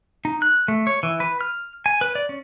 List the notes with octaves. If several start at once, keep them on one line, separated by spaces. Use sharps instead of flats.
D#4
F#6
A3
C#5
E3
B4
F6
G#5
B4
D5
C#4